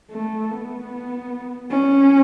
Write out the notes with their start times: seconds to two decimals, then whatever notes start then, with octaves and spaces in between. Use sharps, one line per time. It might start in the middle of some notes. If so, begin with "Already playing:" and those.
0.11 A3
0.51 B3
1.71 C#4